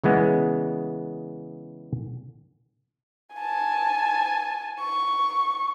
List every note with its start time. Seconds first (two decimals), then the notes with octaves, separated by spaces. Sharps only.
0.04 C#3 E3 G#3 B3
3.36 G#5 A5
4.80 C#6